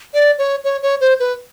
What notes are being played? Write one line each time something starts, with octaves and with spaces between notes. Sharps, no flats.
D5
C#5
C#5
C#5
C5
B4